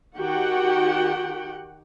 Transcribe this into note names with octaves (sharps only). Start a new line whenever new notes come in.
D#3 F#4 G4 F#5 G5